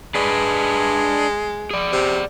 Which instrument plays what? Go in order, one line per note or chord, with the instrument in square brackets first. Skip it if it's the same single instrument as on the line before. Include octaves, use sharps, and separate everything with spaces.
[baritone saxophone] G#3 [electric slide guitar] D4 B4 D5
[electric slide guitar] G#4 D5
[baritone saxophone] C3